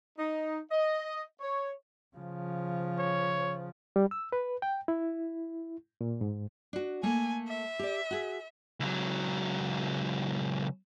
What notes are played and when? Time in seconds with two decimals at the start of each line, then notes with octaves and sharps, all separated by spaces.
0.18 D#4
0.71 D#5
1.40 C#5
2.16 C#3 F3
2.98 C#5
3.96 G3
4.11 E6
4.32 B4
4.62 G5
4.88 E4
6.01 A#2
6.21 G#2
6.73 D4 F#4
7.03 A3 A#3 G#5
7.48 E5
7.79 G4 D5
8.11 F#4 G#4
8.80 C#2 F#3